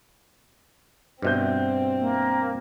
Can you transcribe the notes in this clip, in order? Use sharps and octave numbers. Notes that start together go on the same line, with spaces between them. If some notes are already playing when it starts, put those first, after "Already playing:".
G2 B2 C4 C5 E5 G6
A#3